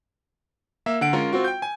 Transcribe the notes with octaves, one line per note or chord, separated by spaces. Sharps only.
A#3 E5
D3 F#5 D7
G#3 C#4 F4 A#4
C4 F4 F#4
G5 G6
G#5